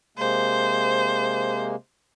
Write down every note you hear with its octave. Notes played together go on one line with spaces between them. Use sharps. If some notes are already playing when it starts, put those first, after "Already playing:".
C3 G#3 A#3 C5